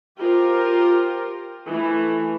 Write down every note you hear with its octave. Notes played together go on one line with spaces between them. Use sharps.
F4 G4 A#4 C5
E3 A3